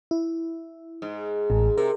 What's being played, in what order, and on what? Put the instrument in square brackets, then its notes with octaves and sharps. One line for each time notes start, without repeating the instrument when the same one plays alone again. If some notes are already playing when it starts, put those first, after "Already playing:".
[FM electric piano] E4
[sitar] G#2
[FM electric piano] A1
[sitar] C3 [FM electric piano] A#4